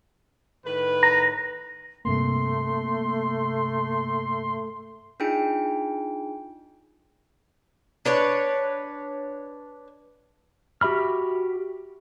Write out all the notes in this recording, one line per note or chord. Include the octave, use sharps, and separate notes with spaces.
A2 D#3 B4
A#5
G2 C3 A3 A#3 C6
D4 D#4 F4 G#4 G5 D7
D4 B4 C#5
F#4 G4 E5 B5 F6